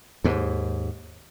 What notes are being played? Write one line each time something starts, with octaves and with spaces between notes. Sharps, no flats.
D#2 G#2